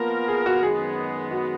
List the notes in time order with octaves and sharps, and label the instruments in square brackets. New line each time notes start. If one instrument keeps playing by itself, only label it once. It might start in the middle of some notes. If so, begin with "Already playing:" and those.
Already playing: [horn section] F3 B3 F4 A#4 [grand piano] A#3
[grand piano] G#4
F#4
[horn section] F#2 D#3 G#3 B3 [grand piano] G#4
[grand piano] F#4